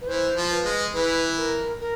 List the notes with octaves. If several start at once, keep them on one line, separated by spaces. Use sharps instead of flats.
B4
E3 C5
F3
B4
G#3
E3 B4
A#4
A#4